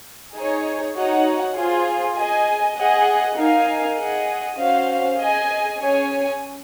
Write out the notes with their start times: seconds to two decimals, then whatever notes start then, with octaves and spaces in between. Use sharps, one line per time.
0.35 D#4 G#4 C#5
0.95 D#4 F#4 C#5 F#5
1.56 F4 G#4 C5
2.16 G#4 D#5 G#5
2.76 G#4 D#5 F#5
3.37 D#4 A#4 F5 G#5
3.97 G#4 D#5 F#5
4.57 C#4 F#4 C5 F5
5.17 G#4 D#5 G#5
5.77 C#4 G#4 C#5 G#5